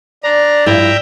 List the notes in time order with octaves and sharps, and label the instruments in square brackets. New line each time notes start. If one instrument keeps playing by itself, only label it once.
[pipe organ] D4 A#5 [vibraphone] D5
[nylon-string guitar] G2 F3 E4 [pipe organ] E5 G5 A#5